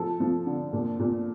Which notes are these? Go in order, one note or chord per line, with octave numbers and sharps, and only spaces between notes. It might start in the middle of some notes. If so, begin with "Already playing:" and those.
Already playing: F3 A4
F3
D3
A#2
A#2